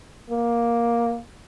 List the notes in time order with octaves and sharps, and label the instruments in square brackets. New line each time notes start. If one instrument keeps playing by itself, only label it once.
[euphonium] A#3